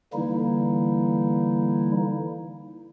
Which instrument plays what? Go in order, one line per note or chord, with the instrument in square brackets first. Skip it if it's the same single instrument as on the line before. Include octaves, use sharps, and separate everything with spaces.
[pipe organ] D3 E3 G3 A#3 D#4 E4